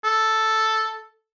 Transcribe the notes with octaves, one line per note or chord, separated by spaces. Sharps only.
A4